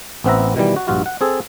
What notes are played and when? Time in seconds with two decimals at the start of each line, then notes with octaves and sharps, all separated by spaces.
0.24 A1 B3 C4 B4 E5 A#5
0.56 B2 D#3 E3 G3
0.76 F#4
0.88 A#1 G2 F4 F#4
1.06 F#5
1.21 C4 G#4 A4